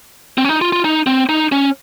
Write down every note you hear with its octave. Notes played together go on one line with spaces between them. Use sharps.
C4
C#4
D#4
F4
F4
D#4
C4
D#4
C#4